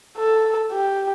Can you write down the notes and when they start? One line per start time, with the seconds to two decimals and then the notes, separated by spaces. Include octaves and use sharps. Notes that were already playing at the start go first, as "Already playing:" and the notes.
0.18 A4
0.72 G4